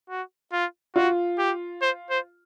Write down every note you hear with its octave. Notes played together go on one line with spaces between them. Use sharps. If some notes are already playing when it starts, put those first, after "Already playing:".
F#4
F4
F4 F#4
G4
C5
C5